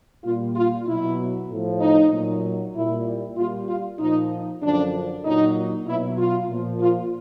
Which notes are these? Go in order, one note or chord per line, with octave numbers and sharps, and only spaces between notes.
A#2 G3 F4
F4
B2 F#3 E4
A2 F3
D#4
A#2 F#3
A#2 G3 E4
A#2 G3 F4
F4
A#2 F3 D#4
F#2 D3 F3 D4
A#2 F#3 D#4
B2 F#3 E4
F4
A#2 F3
F4